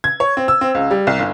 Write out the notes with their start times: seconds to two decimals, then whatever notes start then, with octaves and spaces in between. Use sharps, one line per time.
0.04 G#6
0.20 C#5
0.37 C4
0.48 E6
0.61 C4
0.75 C#2
0.91 G3
1.07 C2
1.19 G1